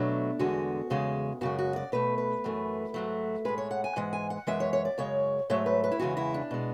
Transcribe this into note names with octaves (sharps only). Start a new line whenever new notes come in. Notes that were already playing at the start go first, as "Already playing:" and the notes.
Already playing: B2 F#3 A3 D4
E2 D3 G#3 F#4
E2 C#3 G#3
F#2 C#3 G#3 F#4
F#4
D5
B2 A3 B4
B4
F#2 E3 A3
G#2 F#3 A3
A2 G#3 B4
C#5
F#5
G#5
G#2 E3 G#3 F#5
G#5
F#5
F#2 E3 G#3 E5
C#5
C#5
D5
F#2 C#3 G#3 C#5
G#2 F#3 A3 C#5
B4
B4
E4
E2 C#3 E3 G#3 F#4
E4
D4
B2 G#3